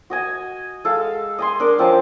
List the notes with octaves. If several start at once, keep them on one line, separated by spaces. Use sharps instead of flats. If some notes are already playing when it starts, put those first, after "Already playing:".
F#4 D#5 G#5
G#3 A4 F5
D#5 G#5 C6
D4 A#4
F3 C4 C#4 A5